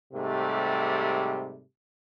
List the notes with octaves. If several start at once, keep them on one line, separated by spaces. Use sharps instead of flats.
G#2 C3 G3 A3